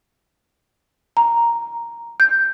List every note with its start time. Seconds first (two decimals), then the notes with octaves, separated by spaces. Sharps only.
1.17 A#5
2.20 G6